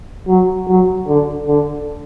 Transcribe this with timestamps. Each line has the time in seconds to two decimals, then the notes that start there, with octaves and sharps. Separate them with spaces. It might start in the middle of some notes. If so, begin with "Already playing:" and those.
0.28 F#3
0.67 F#3
1.07 D3
1.47 D3